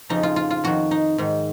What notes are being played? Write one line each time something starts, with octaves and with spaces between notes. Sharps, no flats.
F2 C#3 D#4
F4
F4
F4
F2 D#3 F#4
D#4
G#2 D#3